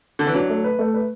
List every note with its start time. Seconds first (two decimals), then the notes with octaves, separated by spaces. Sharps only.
0.19 D3
0.27 E3
0.34 F#3 D4
0.49 A3
0.64 B4
0.79 A3
0.94 B4